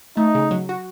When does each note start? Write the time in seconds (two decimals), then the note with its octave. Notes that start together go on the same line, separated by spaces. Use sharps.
0.17 A3 D#4
0.35 C#3
0.51 F#3
0.69 F#4